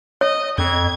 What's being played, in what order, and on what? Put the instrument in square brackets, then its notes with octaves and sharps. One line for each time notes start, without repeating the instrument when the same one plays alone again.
[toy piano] C#5 [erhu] D#5
[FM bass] F2 [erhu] G#6